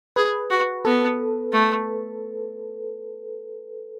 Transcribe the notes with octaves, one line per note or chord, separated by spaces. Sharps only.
G#4 B4
F#4
B3 A4
A3